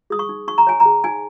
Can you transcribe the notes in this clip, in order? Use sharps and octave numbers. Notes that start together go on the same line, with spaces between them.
G#4 D#6
C#6
D#4
D#4 C#6
A#5
C#5 G#5
A#5
G#4
D#4 G#5